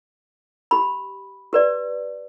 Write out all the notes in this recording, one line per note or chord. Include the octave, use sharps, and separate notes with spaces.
G4 B5
G4 B4 D5